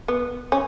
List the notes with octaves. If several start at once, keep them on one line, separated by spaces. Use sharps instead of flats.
B3
C#4